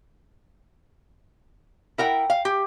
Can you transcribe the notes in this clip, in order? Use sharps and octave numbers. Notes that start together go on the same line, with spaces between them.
E4 A#4 F#5 G5
F5
G4